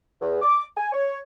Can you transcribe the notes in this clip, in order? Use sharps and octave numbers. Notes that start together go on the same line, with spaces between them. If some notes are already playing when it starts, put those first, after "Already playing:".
E2
D6
G#5
C#5